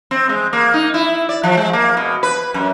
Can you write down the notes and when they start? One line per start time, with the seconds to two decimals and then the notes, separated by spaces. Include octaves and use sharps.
0.11 C4
0.29 G#3
0.53 A#3
0.74 D#4
0.94 E4
1.29 D5
1.43 F3
1.57 G#3
1.73 A#3
1.97 B2
2.23 B4
2.54 F#2